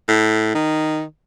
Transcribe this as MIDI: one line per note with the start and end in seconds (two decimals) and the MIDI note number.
0.08 0.50 45
0.55 1.03 51